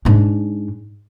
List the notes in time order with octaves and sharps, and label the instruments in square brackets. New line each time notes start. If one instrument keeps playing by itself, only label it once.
[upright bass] G#2 D4